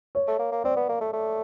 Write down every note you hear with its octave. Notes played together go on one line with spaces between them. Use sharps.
C#5
A3
A#3
A#3
C4 D5
B3
A#3
A3
A3